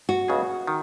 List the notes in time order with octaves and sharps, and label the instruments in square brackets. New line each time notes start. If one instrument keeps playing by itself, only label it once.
[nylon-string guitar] F#4
[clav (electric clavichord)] C#2 C#3 F#3 B3 G#4
D#3